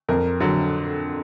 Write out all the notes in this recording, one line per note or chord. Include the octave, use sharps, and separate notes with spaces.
F2 A#4
D3 F#3